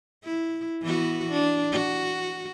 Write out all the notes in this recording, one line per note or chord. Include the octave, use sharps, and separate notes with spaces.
E4
E3 B3 F#4
D4
F#4